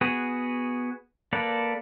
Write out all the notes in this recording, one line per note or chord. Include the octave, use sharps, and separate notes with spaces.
B3 F#4 G#4
A#3 A4 B4 D5